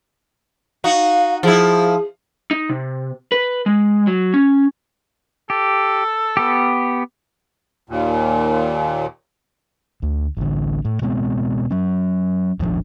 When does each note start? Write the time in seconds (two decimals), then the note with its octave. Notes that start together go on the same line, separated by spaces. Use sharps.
0.84 D#4 F#4 F5
1.43 F3 E4 G#4
2.51 D#4
2.69 C3
3.32 B4
3.66 G#3
4.07 F#3
4.34 C#4
5.50 G4 A4
6.37 B3 G4
7.90 D#2 A#2
10.02 D2
10.37 A1 D3
10.85 A2
11.02 B2 G#3 B3 C4
11.71 F#3 C#4
12.60 D#1 G#1 F3 D4